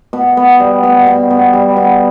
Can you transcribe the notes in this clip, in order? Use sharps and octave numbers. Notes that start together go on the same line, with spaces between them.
B2
B3
G3
B2
B2
B3
G3
B2